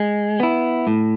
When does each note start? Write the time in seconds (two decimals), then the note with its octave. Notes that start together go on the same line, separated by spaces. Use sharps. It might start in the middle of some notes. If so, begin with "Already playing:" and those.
Already playing: G#3
0.40 B3 E4
0.87 A2